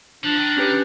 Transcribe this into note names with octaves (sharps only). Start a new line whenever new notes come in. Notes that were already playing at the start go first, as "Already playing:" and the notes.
F3 D4
D#3
C#4 G4 B4